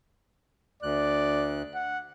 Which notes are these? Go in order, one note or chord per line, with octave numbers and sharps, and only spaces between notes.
D2 D5 F#6
F#5